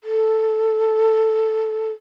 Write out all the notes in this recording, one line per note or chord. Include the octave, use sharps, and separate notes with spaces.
A4